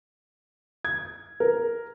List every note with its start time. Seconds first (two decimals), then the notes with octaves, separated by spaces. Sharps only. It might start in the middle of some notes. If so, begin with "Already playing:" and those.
0.85 G#6
1.40 A#4